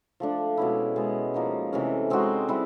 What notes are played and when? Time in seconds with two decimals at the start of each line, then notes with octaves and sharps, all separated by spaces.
0.20 F3 A3 D4
0.57 B2 G#3 C#4 E4
0.96 B2 G#3 B3
1.34 F3 A#3 D#4
1.73 C3 E3 A3 C#4
2.10 G#3 C4 D#4 F#4
2.49 G3 C4 E4